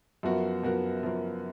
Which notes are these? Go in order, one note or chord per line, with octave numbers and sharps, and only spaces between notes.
F#2 F3 B3 F#4 A#4
F#2 F3 B3 F#4 A#4
F#2 F3 B3 F#4 A#4